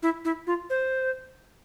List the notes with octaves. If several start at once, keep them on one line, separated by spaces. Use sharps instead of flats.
E4
E4
F4
C5